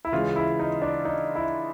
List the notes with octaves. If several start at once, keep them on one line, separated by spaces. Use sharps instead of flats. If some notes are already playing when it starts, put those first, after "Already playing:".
E4
C#3 E3 G#3 F4
E4
D#4
D4
D#4
E4